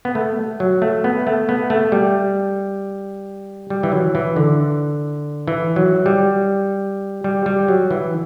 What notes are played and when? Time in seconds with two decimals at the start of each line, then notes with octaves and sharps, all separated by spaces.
0.05 B3
0.15 A3
0.60 F#3
0.82 A3
1.04 B3
1.27 A3
1.49 B3
1.70 A3
1.92 G3
3.70 G3
3.83 E3
3.92 F#3
4.15 E3
4.36 D3
5.48 E3
5.76 F#3
6.06 G3
7.24 G3
7.46 G3
7.68 F#3
7.91 E3